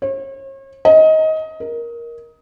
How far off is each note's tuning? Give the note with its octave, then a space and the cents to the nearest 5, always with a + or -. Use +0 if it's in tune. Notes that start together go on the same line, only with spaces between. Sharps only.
C#5 -40
D#5 +20
A#4 +10